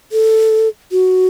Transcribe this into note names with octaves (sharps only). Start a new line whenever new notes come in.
A4
F#4